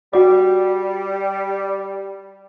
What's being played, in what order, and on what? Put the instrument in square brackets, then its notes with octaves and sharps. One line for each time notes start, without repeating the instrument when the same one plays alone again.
[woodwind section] G3 [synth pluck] F#4 D5